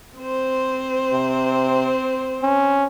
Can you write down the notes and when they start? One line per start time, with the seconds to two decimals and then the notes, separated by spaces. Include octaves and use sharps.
0.18 C4 C5
1.13 C3
2.43 C#4